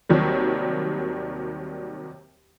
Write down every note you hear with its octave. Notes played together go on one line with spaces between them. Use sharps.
D#2 C3 D#3 F#3 G3